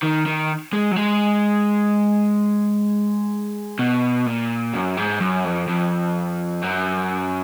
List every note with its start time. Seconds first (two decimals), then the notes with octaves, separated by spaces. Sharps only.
0.02 D#3
0.26 D#3
0.73 G#3
0.91 F#3
0.96 G#3
3.79 B2
4.26 A#2
4.74 F#2
4.97 G#2
5.21 F#2
5.44 F2
5.68 F2
6.62 F#2